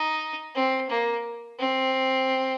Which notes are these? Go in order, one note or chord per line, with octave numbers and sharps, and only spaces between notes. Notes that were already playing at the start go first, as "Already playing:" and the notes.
Already playing: D#4
C4
A#3
C4